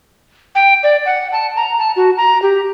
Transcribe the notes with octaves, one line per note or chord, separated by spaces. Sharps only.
G5
D5
F#5
A5
A#5
A5
F#4
A#5
G4